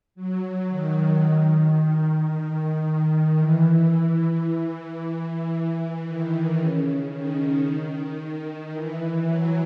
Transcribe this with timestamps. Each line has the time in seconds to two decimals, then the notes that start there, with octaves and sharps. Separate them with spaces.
0.15 F#3
0.68 D#3
1.23 D#3
2.30 D#3
3.37 E3
5.51 E3
6.04 D#3
6.57 C#3
7.11 D#3
8.19 D#3
8.72 E3
9.26 F#3